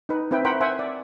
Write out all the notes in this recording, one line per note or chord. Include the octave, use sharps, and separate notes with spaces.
D#4 B4
C4 E4 B4 G5
A#4 C5 F#5 G5 B5
C5 E5 F#5 G#5
D5